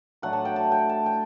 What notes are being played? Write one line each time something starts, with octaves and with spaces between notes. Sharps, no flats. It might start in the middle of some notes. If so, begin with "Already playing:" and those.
A2 F#3 A3 D4 F#5
A5
G5
A5
G5
A5
G5